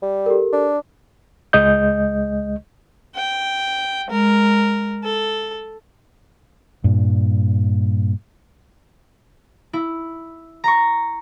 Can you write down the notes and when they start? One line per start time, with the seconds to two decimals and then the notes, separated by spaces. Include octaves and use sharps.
0.02 G3
0.26 G4 A4 A#4
0.53 D4
1.53 C#2 G#3 D#5 G6
3.15 G5
4.08 G#3 A#4
5.03 A4
6.84 G2 A#2
9.73 E4
10.64 A#5 C#6